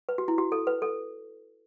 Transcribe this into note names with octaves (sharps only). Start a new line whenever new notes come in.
B4
F#4
E4
F#4
A4
B4
A4